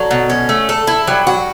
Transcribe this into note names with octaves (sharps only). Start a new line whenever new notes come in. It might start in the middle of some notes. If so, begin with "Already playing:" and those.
Already playing: D3 F#3
B2
C#4
A3
A4
E4
F#3 G3
F#4